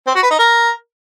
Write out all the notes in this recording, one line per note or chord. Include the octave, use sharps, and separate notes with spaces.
C4
F#4
B4
D#4
A#4